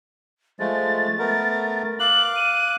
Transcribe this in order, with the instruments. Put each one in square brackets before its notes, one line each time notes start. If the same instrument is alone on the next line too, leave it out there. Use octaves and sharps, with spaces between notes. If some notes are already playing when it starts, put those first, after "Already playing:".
[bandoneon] F3 G#3 A3 [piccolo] A6
[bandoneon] A3 B3 A#4
[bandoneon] F5 D6 F#6 [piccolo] F#7
[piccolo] D#7